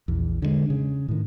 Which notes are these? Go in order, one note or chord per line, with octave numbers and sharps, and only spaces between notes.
A#1 E2
D3 E3 G#3
C#3
A2 D#3